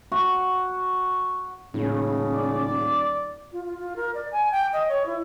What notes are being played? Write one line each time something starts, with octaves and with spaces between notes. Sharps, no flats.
F#4
D#1 A2 C#3
D5
F4
F4
F4
A#4
D5
G#5
G5
D#5
C#5
E4